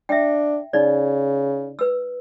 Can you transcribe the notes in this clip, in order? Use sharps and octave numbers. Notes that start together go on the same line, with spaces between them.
D4 E5 G5
C#3 D#4 D5
B4 E6